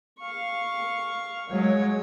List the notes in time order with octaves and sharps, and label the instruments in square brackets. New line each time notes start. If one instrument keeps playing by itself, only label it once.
[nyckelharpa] F5 C#6
[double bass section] F#3 G#3 [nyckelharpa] C#5